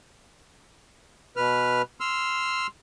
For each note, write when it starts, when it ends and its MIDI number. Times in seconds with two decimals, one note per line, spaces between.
1.37 1.82 47
1.37 1.82 71
1.37 1.82 89
2.00 2.67 84
2.00 2.67 88
2.00 2.67 89